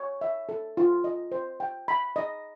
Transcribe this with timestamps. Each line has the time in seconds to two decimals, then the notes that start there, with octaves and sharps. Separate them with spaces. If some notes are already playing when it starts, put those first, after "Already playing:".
Already playing: C#5
0.21 E5
0.49 A4
0.77 F4
1.04 D#5
1.32 C5
1.60 G5
1.88 B5
2.16 D#5